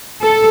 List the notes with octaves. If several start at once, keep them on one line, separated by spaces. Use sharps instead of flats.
A4